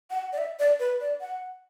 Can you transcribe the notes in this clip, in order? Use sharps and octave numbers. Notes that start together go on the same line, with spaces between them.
F#5
D5
E5
D5
B4
D5
F#5